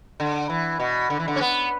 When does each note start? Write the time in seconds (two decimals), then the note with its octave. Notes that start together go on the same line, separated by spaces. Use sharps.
0.20 D3
0.49 E3
0.80 B2
1.10 D3
1.19 E3
1.28 D3
1.36 C#4
1.41 B3